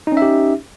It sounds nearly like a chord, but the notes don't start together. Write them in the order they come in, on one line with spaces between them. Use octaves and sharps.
D#4 C#4 E5 G4